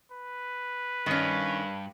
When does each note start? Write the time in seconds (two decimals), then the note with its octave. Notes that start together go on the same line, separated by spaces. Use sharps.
0.12 B4
1.06 G2 D#3 C#4